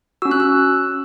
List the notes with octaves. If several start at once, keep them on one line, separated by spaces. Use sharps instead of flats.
C#4 F#4 E6
F#6
E6